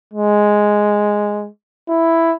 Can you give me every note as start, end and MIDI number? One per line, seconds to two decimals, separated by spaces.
0.13 1.48 56
1.89 2.34 64